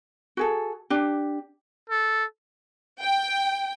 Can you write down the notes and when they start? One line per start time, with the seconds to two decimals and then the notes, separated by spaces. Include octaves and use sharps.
0.37 F#4 G#4 A4
0.90 D4 G4
1.90 A4
3.01 G5